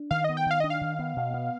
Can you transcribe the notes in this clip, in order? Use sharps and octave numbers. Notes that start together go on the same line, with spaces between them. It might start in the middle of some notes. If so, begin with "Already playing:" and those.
Already playing: D4
D#3 F5
B3 D#5
G5
D#3 F5
D4 D#5
F5
D#3
B3
B2
B3